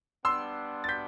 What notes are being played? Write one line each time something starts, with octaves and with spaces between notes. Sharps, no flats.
G3 B3 D4 C6 E6
A6
G6 B6